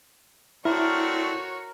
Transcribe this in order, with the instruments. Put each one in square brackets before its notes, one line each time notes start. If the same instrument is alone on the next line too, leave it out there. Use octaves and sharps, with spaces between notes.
[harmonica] A3 C4 D4 [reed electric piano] E4 [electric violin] F#4 C#5 [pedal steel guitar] A#4